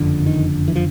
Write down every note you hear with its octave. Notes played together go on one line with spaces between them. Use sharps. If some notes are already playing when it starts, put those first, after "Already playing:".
Already playing: F#1 F2 D3
D#3
E3
F3